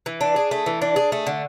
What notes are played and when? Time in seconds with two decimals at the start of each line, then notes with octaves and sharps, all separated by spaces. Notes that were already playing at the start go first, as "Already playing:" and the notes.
0.06 E3
0.21 D4
0.36 G#4
0.51 A3
0.66 E3
0.82 D4
0.96 G#4
1.12 A3
1.27 D3